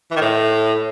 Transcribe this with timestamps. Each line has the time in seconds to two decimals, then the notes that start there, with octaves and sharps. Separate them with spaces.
0.11 E3
0.16 D#3
0.21 A2